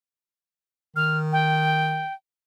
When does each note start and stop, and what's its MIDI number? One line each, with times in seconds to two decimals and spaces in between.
0.96 2.05 51
0.96 1.18 89
1.32 2.13 79